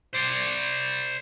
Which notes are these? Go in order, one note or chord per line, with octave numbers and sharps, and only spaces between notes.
C5 D5